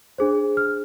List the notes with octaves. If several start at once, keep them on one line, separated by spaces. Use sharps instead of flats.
D4 G#4 C5
F6